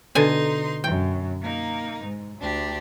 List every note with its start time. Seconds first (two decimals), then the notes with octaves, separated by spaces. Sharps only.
0.15 B2 D3 D#4 G#5 C6
0.84 F#2 G5
1.42 A#3 D#4
2.05 G#2
2.39 D2 D4 G4